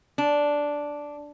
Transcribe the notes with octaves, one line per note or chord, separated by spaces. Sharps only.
D4